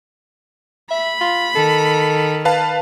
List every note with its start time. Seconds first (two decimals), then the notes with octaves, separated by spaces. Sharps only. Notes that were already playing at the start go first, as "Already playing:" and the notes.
0.90 E5 B5
1.21 F4
1.55 D#3 A4
2.45 B4 F5 A5